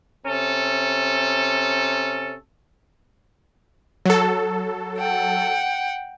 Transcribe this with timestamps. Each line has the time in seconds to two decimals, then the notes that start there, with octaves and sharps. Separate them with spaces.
0.25 C3 C#4 A4
4.06 F#3 A4
4.97 F#5 G5